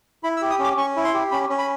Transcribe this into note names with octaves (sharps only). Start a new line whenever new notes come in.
E4 B5
E6
G4
D#6
C#4
D6
C#4 C#6
E4
C6
G4
C#4 B5
C#4
B5